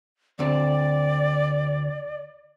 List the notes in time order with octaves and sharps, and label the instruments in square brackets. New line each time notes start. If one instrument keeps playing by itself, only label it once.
[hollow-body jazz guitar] D2 D3 C4 [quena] D5